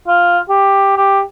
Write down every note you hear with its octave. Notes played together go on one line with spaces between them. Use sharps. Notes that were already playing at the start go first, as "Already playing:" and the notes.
F4
G4
G4